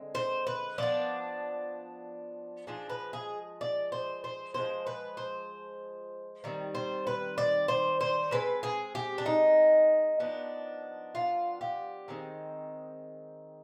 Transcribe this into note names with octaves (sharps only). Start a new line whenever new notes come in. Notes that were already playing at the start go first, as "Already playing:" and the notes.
Already playing: D3 G#3 C4
C5
B4
F3 B3 D4 D5
F3 G#3 D4
B4
G#4
D5
C5
C5
F3 G#3 B3 C5
B4
C5
D#3 G3 C4
C5
B4
D5
C5
C5
D3 G#3 C4 B4
G#4
G4
D4
D#4
F3 B3 D4
F4
G4
D#3 G#3 C4